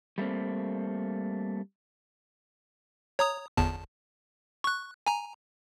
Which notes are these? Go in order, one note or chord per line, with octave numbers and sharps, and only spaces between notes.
G3 A3 A#3 C4
C#5 A#5 D#6
G1 E2 A5
C#6 F#6
G#5 A#5